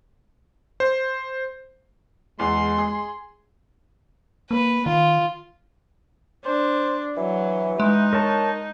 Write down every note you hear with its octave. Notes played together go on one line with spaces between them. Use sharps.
C5
E2 G#3 C6
G#4
A#3 B4
D#3 F4
D4 C5
E3 F#3
G#3 D#4
A#4 C#5 A5